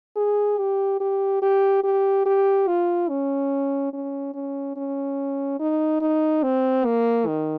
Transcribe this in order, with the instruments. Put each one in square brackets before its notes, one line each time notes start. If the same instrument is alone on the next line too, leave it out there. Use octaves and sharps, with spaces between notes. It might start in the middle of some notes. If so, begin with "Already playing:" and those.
[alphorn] G#4
G4
G4
G4
G4
G4
F4
C#4
C#4
C#4
C#4
D#4
D#4
C4
A#3
D#3